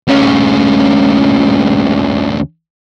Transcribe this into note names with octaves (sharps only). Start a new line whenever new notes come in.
D2 C#4